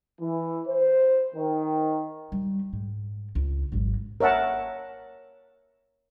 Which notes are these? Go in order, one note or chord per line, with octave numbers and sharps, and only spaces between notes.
E3
C5
D#3
G3
G#2
C#2
G#1 F#3
A#4 C#5 E5 F#5 A5